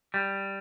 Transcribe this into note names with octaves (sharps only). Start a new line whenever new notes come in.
G3